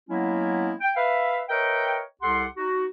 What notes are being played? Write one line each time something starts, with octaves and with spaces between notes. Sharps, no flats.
F#3 G#3 A#3 B3 C#4 E4
G5
B4 E5 F5
A#4 B4 C#5 D#5 E5 G5
C2 G4 A4 F#5 C6
D#4 F#4